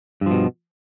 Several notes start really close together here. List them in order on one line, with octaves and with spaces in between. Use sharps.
G2 F3 B2